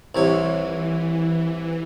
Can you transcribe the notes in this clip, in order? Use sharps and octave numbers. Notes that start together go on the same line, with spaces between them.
C2 C3 E3 C#5